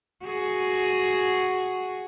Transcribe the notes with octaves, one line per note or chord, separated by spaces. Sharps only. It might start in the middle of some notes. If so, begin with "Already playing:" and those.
F#4 G#4